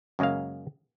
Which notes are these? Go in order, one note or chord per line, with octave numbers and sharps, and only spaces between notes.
F#2 C#3 G#3 A#3 F5